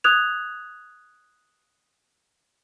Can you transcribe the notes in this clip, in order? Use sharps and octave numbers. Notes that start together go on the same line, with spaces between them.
D#6 F#6 G#6 F7